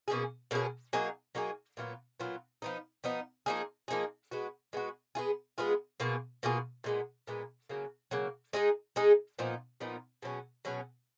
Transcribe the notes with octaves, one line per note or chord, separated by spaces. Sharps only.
B2 A#3 C#4 G#4
B2 A#3 C#4 G#4
F#3 A#3 D#4 G#4
F#3 A#3 D#4 G#4
A#2 F#3 B3 F4
A#2 F#3 B3 F4
F3 B3 D#4
F3 B3 D#4
F3 A#3 D#4 G#4
F3 A#3 D#4 G#4
G#3 B3 F#4
G#3 B3 F#4
G#3 B3 F4 G#4
G#3 B3 F4 G#4
B2 A#3 F4 G#4
B2 A#3 F4 G#4
A#2 G#3 B3
A#2 G#3 B3
C#3 F#3 A#3
C#3 F#3 A#3
G#3 D#4 G#4
G#3 D#4 G#4
A#2 F3 B3 D#4
A#2 F3 B3 D#4
B2 F#3 C#4 G#4
B2 F#3 C#4 G#4